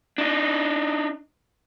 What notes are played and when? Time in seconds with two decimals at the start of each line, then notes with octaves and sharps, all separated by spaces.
0.18 D4 D#4